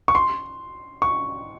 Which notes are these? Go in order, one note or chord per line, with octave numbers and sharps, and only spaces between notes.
C#6
C6
C#6